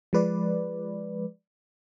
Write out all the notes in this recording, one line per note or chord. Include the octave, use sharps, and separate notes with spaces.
F3 G#3 B4 D5